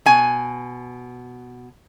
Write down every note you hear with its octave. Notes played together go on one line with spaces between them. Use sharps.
B2 G#5